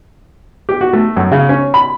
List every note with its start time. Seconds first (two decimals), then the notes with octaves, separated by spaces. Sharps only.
0.69 G4
0.81 F#4
0.93 A3
1.17 F#2
1.32 C#3
1.49 C#4
1.74 B5